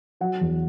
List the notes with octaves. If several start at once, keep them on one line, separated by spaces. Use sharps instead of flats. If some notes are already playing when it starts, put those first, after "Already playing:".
F#3 F#5
E2